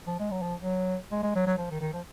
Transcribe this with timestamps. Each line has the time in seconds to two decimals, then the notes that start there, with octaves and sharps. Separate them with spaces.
0.07 F3
0.20 G#3
0.31 F#3
0.42 F3
0.60 F#3
1.12 G#3
1.23 G#3
1.35 F#3
1.47 F#3
1.58 F3
1.70 D#3
1.81 D#3
1.93 F3